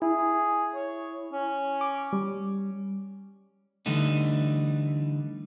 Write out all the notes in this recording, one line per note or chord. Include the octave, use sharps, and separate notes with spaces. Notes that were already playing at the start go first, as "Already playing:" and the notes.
E4 G#4
C#5
C#4
D6
G3
D3 E3 G3 A3 D#4